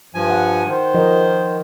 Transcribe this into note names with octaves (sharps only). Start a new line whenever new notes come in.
G2 F3 G#5
F#5
D#3 C5
F3 A#4 D#5